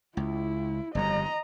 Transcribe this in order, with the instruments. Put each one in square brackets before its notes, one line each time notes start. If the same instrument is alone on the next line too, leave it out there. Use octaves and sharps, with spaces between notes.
[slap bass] C#2 [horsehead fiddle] E4
[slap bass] G1 F2 G3 [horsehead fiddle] D#5 A#5